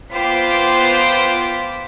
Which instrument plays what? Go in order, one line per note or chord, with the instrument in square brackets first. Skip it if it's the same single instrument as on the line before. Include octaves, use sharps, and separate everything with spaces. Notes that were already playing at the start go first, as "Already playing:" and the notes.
[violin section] B3 F4 C5 G5 D6 B6